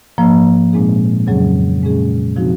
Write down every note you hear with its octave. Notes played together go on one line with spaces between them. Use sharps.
G#2 F3 A#3
A#2 G#3 C4 D#4 G#4
F2 C#3 F#3 C#4 G#4
A#2 G#3 C#4 G#4
C3 F3 C4 D#4 F#4